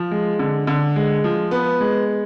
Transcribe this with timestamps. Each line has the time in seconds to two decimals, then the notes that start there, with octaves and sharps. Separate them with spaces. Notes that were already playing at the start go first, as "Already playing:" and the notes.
Already playing: F3
0.11 G#3
0.39 D3
0.67 D3
0.96 G#3
1.24 F3
1.51 B3
1.81 G#3